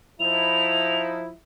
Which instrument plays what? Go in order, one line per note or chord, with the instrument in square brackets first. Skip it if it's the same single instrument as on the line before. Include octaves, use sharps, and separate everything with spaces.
[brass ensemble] F3 D#4 E4 [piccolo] F7